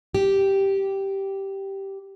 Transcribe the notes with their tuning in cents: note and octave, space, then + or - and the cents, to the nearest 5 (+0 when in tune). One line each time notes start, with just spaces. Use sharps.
G4 -5